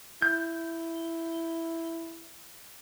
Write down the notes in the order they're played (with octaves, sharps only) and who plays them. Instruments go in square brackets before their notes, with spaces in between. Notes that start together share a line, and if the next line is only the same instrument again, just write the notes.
[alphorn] E4 [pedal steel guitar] G6